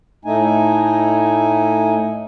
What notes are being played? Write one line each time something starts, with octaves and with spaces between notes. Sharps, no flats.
A2 A3 D#4 G#5